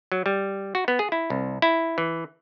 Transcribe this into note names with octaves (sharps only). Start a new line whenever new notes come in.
F#3
G3
F#4
B3
G#4
E4
C2
E4
E3